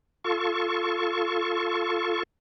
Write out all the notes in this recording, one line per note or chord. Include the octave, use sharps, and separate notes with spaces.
F4 A4 C#6